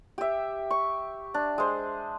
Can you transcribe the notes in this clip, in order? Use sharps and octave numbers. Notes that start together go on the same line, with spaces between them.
G4 E5
C#6
D4
G#3 C5